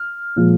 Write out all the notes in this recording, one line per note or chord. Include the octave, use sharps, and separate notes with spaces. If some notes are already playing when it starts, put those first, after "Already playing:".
Already playing: F6
A#2 F3 G#3